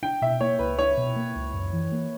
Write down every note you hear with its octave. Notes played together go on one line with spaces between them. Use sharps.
D4 G5
B2 E5
A#3 C#5
C#2 B4
D4 C#5
B2
A#3
C#2
F#2
E3
A#3